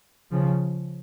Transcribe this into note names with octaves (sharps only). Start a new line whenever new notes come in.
C#3 F3